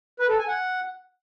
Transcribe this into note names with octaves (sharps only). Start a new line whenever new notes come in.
B4
A4
G#5
F#5